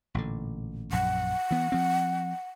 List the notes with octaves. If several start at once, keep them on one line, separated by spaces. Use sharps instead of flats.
A1 A#2 D3
A#1 F#2 F#5
E3 B3
F3 C4